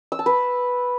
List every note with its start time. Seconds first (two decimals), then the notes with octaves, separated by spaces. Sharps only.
0.12 E6
0.19 A5
0.26 B4